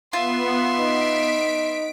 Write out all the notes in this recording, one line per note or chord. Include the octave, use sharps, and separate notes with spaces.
B3 F4 E5 C6
D#4 B6 D7